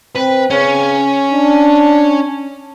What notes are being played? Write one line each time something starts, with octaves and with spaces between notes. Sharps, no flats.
C4 B4
C#3 C#4
D4